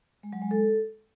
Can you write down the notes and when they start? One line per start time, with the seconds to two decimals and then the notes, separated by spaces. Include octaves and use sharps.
0.23 G#3
0.33 F#3
0.42 G#3
0.51 A4